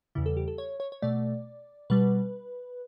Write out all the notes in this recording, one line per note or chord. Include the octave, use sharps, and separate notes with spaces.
E2 C#3 G3 E4
A4
G4
A4
C#5
C#5
C#5
B2 A3 D5
B2 G3 B4